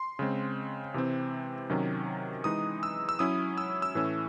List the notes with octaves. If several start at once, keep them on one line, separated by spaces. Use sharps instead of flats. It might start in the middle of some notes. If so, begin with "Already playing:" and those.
Already playing: C6
C#3 G#3 C4
C3 E3 C4
C3 D#3 F#3 C#4
E3 G#3 D#4 D#6
E6
E6
F#3 C#4 E4 D#6
E6
E6
A2 E3 A3 C#4